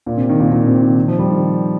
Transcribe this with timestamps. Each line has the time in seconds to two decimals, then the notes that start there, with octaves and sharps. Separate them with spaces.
0.06 A#2
0.17 C3
0.29 D#3
0.40 A#2
0.52 A#2
0.67 C3
0.82 D#3
0.96 D#3
1.08 F3
1.19 G3
1.31 D#3